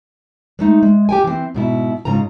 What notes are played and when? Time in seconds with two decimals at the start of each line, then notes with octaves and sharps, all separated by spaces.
0.59 G#3 A3 D#4
0.83 G#3
1.09 G4 G5 G#5
1.24 E3 C4
1.54 G#2 B2 E4
2.05 G#2 C#3 F4 A#5